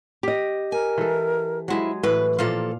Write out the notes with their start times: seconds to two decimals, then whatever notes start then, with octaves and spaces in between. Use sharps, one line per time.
0.23 G4 D#5
0.72 A#4 G#5
0.98 E3 A4
1.68 F3 F#3 G#3 E4 G#4
2.03 A2 E3 B4
2.39 A#2 F3 A#3 A4 F5